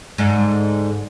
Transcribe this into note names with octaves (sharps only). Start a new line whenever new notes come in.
G#2 D3